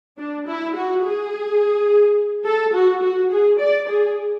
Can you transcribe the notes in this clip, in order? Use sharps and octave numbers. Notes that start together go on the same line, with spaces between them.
D4
E4
F#4
G#4
A4
F#4
F#4
G#4
D5
G#4